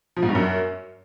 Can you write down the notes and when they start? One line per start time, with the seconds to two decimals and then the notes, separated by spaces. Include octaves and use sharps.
0.17 F3
0.23 G#2
0.29 G2
0.35 F#2